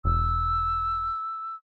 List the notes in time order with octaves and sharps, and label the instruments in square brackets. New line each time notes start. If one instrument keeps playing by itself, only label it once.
[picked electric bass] E1 [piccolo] E6